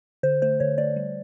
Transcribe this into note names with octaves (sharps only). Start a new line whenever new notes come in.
D3 C5
A3 C5
D3 C#5
A3 D5
G3